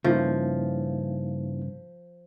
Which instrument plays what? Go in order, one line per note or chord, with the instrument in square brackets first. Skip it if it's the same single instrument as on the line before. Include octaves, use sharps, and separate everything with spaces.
[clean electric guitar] G2 C#3 [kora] F3 [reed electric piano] A#3 D#4 E4